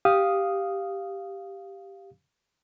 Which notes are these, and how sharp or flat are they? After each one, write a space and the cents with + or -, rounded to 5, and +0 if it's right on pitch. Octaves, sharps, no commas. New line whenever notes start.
G4 +0 F5 +0 D#6 +0